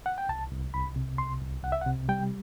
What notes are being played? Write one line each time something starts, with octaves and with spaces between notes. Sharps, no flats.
F#5
G5
C2 A5
C2
C2 B5
C3
C2 C6
C2
C2 F#5
E5
F#5
C3
G3 G5